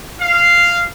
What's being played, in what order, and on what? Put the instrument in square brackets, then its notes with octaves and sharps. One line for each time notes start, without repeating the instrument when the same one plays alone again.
[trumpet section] F5